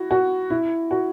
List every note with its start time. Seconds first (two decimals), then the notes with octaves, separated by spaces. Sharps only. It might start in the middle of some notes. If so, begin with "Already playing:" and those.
Already playing: E4 F#4
0.11 F#4
0.50 E4
0.91 F#4